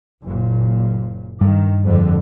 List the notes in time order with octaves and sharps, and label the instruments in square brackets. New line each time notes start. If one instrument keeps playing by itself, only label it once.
[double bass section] F#1 A#2
[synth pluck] G2 [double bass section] D#3
[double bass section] G#1 F2 D3